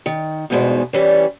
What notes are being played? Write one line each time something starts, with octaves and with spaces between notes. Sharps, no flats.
D#3
E2 G2 B2 G#3 D#4 C5
E3 G3 C#4 D5